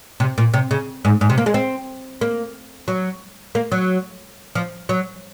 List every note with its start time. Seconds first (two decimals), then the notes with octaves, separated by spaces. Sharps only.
0.20 C3
0.38 A#2
0.54 C3
0.71 C#3
1.05 G#2
1.21 G#2
1.30 C3
1.38 A#3
1.46 G#3
1.54 C4
2.21 A#3
2.88 F#3
3.55 A#3
3.72 F#3
4.55 F3
4.89 F#3